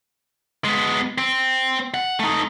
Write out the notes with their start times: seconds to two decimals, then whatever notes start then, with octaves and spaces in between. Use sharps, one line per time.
0.65 G#3 B3
1.18 C4
1.94 F#5
2.19 A3 D#4